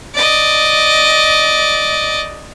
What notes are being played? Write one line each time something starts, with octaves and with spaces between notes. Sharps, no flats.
D5 D#5